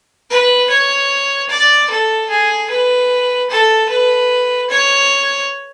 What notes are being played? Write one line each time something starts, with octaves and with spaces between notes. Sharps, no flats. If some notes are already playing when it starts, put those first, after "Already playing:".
B4
C#5
D5
A4
G#4
B4
A4
B4
C#5